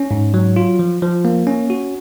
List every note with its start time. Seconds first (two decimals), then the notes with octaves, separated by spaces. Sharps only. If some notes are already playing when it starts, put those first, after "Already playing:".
Already playing: C#4
0.11 G#2
0.34 F#3
0.56 F4
0.79 F3
1.02 F3
1.25 A#3
1.47 C#4
1.70 F#4